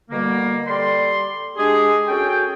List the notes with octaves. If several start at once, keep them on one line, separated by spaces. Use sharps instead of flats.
B2 D3 G3 A#3
G3 A4 D5 C6
G#3 D4 G4 G#4
C#4 F#4 G#4 A4 G5